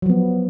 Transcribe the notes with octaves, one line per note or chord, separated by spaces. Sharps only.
F3 F#3 B3